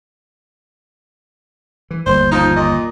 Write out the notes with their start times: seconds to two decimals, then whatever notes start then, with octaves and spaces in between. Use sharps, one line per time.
1.91 E3
2.06 G1 D#2 C5
2.32 F3 D#4
2.56 A#2 D#5